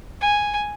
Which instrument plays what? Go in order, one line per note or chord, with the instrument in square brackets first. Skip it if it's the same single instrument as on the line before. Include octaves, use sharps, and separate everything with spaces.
[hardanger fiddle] G#5